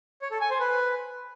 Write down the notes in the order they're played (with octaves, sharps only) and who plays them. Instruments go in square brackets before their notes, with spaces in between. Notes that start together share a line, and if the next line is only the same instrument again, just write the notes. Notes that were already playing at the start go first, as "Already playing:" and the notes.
[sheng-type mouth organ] C#5
A4
G#5
C5
B4